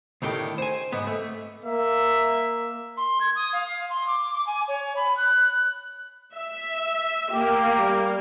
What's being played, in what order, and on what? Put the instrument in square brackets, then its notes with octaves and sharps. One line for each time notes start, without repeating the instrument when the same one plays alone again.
[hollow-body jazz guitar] D2 A2 D#3 G4
C5 G#5
G#2 B3
A3
[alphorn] A#3 [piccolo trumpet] E5
[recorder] C6
G#6
D#6
F5
C6
D6
D6
G#5
C#5
B5
F#6
[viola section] E5
[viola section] A#3 [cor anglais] G4
[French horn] G3